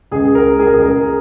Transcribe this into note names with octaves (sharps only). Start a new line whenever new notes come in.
C#2 G#4
A#4
G#3
G#4
A#4
C#2 G#4
A#4